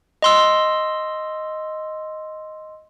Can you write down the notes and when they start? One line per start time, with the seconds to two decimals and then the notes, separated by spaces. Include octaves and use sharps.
0.22 D#5 C6 E6